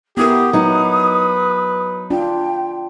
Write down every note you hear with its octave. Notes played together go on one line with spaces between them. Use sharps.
B3 E4 G4 A#4 D#6
F#3 D#4 B4
D4 F4 G5